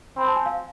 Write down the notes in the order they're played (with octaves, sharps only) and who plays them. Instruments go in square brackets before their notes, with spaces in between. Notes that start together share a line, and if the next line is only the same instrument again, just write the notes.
[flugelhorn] C4 [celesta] B5
[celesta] A5
G#5
F5